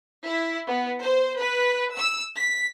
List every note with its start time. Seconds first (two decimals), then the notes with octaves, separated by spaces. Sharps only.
0.25 E4
0.67 B3
1.02 C5
1.40 B4
1.96 E6
2.37 B6